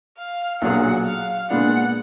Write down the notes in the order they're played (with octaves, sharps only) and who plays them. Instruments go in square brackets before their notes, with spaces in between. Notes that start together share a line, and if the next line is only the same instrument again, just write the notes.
[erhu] F5
[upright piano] B1 A#2 F#3 D4 G#4 [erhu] F#5
[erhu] F5
[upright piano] A#2 G#3 B3 D4 [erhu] F#5